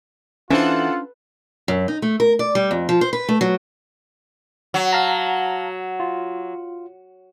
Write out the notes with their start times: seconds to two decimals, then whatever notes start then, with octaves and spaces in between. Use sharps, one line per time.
0.50 E3 C#4 D4 F4 A4 C5 F#5
1.68 F#2
1.88 D#4
2.02 A3
2.20 A#4
2.39 D5
2.55 G3
2.71 F2
2.89 F3
3.01 C5
3.13 B4
3.29 A3
3.41 F#3
4.74 F#3
4.93 F5 A5 A#5
6.00 F4